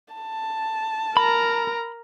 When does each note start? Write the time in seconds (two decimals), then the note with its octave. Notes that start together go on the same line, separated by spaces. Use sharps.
0.14 A5
1.17 A#4 A#5 B5